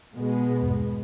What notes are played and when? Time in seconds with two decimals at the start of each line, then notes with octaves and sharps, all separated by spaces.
0.15 B2 G#3 B3
0.62 E2 G2